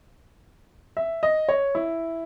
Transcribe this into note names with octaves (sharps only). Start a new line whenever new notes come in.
E5
D#5
C#5
E4